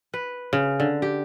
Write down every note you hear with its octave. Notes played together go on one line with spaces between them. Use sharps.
B4
C#3
D3
G4